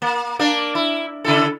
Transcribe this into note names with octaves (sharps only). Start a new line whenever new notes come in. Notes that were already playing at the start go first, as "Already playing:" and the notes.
A#3
A#3 D4
E4
C#3 E4 A4